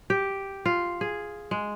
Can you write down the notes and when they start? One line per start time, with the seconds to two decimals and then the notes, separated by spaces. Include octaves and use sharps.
0.10 G4
0.66 F4
1.01 G#4
1.51 G#3